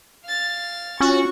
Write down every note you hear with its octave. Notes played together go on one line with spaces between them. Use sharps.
F5 A6
C#4 F4 F#4 C#6